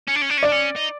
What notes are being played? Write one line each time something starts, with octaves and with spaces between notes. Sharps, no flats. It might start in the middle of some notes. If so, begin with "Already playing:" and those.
C#4
D4
C#4
D4
C#4
D4 D5
C#4
D#4